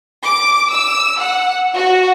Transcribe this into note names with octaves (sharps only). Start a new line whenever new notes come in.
D6
E6
F#5
F#4